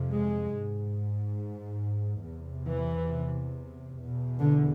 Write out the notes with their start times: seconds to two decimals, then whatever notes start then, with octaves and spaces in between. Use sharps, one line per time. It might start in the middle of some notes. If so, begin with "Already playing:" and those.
Already playing: F2 C3
0.13 G#3
0.55 G#2
2.25 E2 C3
2.69 E3
3.97 E2 B2
4.39 D3